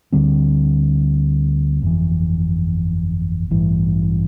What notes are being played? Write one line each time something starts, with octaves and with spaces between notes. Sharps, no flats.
D2 D3 G3 C4
G1 F2 E3
A1 G2 E3